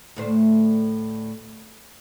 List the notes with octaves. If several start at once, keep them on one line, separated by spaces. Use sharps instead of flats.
D2 A2 C5